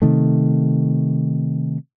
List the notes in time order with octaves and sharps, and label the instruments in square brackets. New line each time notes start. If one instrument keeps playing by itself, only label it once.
[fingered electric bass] C3 D#3 A3